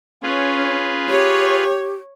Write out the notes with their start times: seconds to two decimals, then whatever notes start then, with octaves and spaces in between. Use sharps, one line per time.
0.23 C#4 F4 G#4 B4
1.10 G4 C#5